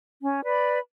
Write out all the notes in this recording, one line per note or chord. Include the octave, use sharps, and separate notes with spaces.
C#4
B4 D5 B5